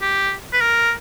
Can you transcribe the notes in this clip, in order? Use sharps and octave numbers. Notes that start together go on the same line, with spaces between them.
G4
B4
A#4